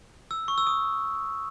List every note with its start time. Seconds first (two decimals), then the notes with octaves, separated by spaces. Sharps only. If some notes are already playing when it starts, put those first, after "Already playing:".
0.31 E6
0.48 C#6
0.58 E6
0.67 D#6